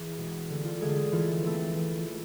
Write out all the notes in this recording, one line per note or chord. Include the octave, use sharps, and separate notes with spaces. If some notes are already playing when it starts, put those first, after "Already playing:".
Already playing: E3 G#4
B2 G#3 C4
D3 A3 C4
F4
D3 G#3 A3 C4 G#4
E3 A3 C4 F4
E3 A3 C4
E3 A3 C4
E3 A3